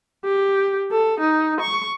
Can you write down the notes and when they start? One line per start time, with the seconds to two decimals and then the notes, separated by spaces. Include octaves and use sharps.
0.25 G4
0.92 A4
1.20 D#4
1.61 C#6